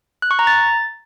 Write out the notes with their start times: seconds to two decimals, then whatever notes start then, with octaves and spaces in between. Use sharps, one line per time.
0.22 F#6
0.31 C#6
0.39 A#5
0.47 A6